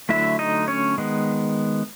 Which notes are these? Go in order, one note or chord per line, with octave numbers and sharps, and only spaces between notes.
D3 F#3 A3 E4 E5
D#4 D#5
C#4 C#5
D#3 G#3 B3